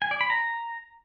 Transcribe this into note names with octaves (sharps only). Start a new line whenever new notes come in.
G#5
D5
B5
A#5